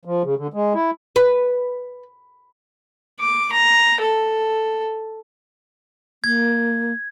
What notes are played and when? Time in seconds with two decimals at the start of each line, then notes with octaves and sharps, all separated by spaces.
0.05 F3
0.24 C#3
0.37 D3
0.54 G#3
0.74 E4
1.16 B4
3.20 D6
3.52 A#5
4.01 A4
6.24 A#3 G#6